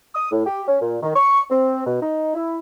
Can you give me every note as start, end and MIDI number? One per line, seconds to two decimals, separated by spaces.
0.15 0.27 87
0.32 0.44 45
0.46 0.63 67
0.67 0.78 61
0.81 0.97 46
1.03 1.14 51
1.16 1.42 85
1.50 1.82 60
1.87 1.98 47
2.01 2.31 63
2.35 2.59 64